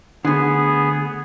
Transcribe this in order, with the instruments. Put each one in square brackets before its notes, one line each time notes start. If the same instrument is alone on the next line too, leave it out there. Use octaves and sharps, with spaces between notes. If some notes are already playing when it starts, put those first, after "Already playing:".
[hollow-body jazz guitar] D2 D3 [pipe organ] B3 G#4